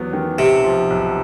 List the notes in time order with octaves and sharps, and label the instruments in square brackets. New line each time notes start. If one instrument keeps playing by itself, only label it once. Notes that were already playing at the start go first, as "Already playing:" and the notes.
Already playing: [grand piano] E2 F#3 B3
D#3
[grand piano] B1 [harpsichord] C3
[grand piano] F3
B1